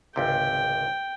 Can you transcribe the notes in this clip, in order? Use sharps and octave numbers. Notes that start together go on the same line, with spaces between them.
G#1 C#2 C3 G5